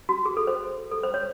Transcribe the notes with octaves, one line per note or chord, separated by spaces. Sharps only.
F#4
G#4
A4
C5
A4
C5
C#5